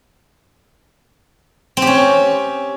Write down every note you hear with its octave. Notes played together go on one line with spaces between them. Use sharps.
C4
G4
C#4